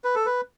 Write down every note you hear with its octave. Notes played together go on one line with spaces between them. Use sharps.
B4
A4
B4